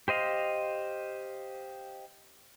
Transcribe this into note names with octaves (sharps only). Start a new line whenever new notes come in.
G4 C5 D#5 F5